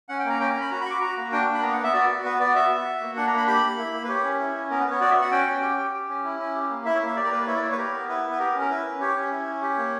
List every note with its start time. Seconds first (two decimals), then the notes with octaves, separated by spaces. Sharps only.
0.09 C#4 F#5
0.20 G5
0.25 A#3 A#5
0.40 C#4 G5
0.50 A#5
0.55 C#4
0.61 B5
0.70 F#4 A#5
0.81 B5
0.86 F#4 C#6 D6
1.01 F#4 A#5
1.17 A#3
1.32 D4 G5
1.47 A#3
1.55 B5
1.63 B3 A#5
1.73 F#5
1.78 B3
1.84 E5
1.94 F#4 D5
2.09 F#4
2.24 B3 B4
2.40 B3 D5
2.55 F#4 E5
2.70 F#4
2.85 F#4
3.01 A#3
3.16 D4 F#5
3.27 A#5
3.32 A#3 B5
3.47 G4 B5
3.63 A#3
3.78 E4
3.93 A#3
4.04 B4
4.09 G4 C#5
4.24 C#4
4.39 E4
4.55 C#4
4.70 B3 A#4
4.80 B4
4.85 B3
4.91 C#5
5.01 F#4 D5
5.11 E5
5.16 F#4
5.22 F#5
5.31 C#4 G5
5.47 C#4
5.63 G4
5.78 G4
5.93 G4
6.09 C#4
6.24 E4
6.39 C#4
6.55 G4
6.70 A#3
6.85 E4 E5
6.95 C#5
7.01 A#3
7.06 E5
7.16 G4 D5
7.26 A#4
7.32 A#3 B4
7.47 E4 C#5
7.57 D5
7.62 A#3 C#5
7.72 B4
7.77 G4 A#4
7.93 B3
8.08 E4 B4
8.23 B3
8.31 B4
8.39 G4 A#4
8.55 C#4
8.61 A#4
8.70 E4 B4
8.85 C#4
9.00 G4 C#5
9.16 C#4
9.31 E4
9.47 C#4
9.62 G4
9.78 A#3